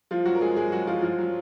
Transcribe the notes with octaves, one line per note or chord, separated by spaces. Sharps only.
F3 F4
F#3 F#4
A#4
G#3 G#4
G#3 G#4
F#3 F#4
F3 F4
F3 F4
F#3